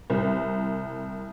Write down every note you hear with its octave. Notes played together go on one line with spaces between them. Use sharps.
C2